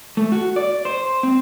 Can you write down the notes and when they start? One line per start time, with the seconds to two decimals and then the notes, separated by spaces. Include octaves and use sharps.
0.17 A3
0.32 F#4
0.56 D5
0.85 C5
1.23 C4